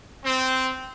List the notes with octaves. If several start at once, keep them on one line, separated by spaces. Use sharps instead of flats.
C4